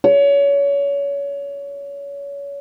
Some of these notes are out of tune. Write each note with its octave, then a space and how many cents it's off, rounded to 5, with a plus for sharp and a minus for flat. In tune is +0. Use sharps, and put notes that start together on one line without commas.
C#5 +30